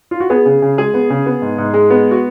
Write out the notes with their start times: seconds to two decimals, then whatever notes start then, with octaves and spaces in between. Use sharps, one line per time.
0.11 F4
0.20 F#4
0.30 B3 G#4
0.46 C#3
0.62 C#3
0.78 G#3 G#4
0.94 B3
1.10 C#3
1.26 B3
1.42 G#2
1.58 G#2
1.74 G#3
1.90 B3
2.11 F#4